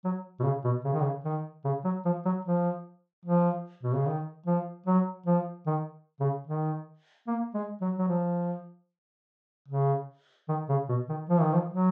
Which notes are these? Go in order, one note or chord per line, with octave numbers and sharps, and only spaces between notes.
F#3
B2
C#3
B2
C#3
D#3
C#3
D#3
C#3
F#3
F3
F#3
F3
F3
B2
C#3
D#3
F3
F#3
F3
D#3
C#3
D#3
A#3
G#3
F#3
F#3
F3
C#3
D#3
C#3
B2
D#3
F3
D#3
F3
F#3